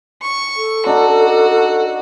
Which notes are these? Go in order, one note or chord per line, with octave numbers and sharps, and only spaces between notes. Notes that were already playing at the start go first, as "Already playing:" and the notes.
C#6
A4
D4 D#4 F#4